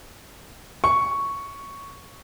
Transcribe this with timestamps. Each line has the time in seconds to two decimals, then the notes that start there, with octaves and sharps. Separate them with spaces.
0.84 C#6